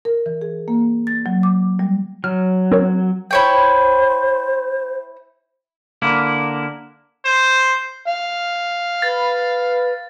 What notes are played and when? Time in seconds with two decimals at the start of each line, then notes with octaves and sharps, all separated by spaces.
0.05 A#4
0.26 E3
0.42 G#4
0.68 A#3
1.07 A6
1.26 F#3
1.43 D6
1.79 G3
2.24 F#3 F6
2.71 C4 A#4 C#5
3.31 E4 C5 C#5 G5
6.02 D3 A#3 E4
7.25 C5
8.07 F5
9.02 B4 A6